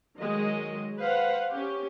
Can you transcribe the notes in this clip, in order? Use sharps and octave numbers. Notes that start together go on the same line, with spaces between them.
D#3 F#3 G#3 D#5
B4 C5 F5 F#5
C#4 G4